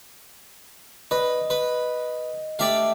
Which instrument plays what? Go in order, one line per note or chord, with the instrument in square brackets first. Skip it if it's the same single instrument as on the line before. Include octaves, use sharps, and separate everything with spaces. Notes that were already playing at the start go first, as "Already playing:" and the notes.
[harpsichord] B4 [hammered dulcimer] D#5
[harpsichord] B4
[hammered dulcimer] A3 G4 [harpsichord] D5 E5 F5